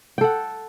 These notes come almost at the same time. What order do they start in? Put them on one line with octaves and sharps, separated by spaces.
G5 A4 F#5